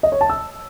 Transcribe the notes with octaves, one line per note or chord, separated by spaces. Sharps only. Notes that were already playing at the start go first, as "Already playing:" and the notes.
D#5
C#5
A5
E6